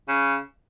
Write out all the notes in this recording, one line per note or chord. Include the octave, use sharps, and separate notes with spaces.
C#3